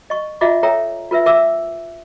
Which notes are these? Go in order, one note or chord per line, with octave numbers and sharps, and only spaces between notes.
D#5 C#6
F4 D#5 E5 F#5 A#5 D6
A4 A#4 C#5 E5 G5 A#5
F4 A#4 B4 E5
A#4 E5 D6 E6